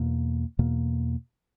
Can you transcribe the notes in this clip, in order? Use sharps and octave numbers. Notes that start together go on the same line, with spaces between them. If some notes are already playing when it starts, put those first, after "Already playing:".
Already playing: E2 B2 A#3
E2 B2 A#3